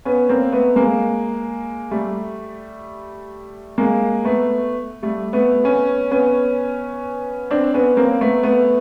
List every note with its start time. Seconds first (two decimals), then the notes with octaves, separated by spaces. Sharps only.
0.05 B3 C#4
0.29 A#3 C4
0.52 A3 B3
0.76 G#3 A#3
1.91 G3 A3
3.78 G#3 A#3
4.24 A3 B3
5.03 G3 A3
5.33 A3 B3
5.64 B3 C#4
6.11 B3 C#4
7.51 C4 D4
7.74 B3 C#4
7.97 A#3 C4
8.21 A3 B3
8.43 A3 B3